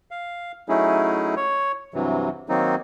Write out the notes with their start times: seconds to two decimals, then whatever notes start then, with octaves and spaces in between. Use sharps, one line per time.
0.11 F5
0.69 F#3 A3 C#4 D#4 E4 G#4
1.36 C#5
1.94 G2 C3 E3 F#3
2.49 D#3 F#3 A#3 C4 D#4